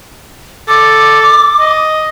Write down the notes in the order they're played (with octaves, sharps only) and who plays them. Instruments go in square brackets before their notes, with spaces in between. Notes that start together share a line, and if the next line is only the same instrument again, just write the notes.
[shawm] A4 [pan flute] D6
[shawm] D#5